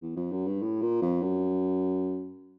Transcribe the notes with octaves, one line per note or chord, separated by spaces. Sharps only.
E2
F2
F#2
G2
A2
A#2
F2
F#2